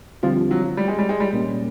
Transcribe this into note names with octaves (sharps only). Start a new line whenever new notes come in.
D3 F3 G3 C4 F4
F#3
G3
G#3
G3
G#3
G3
C2 A#2 G3 A#3 C#4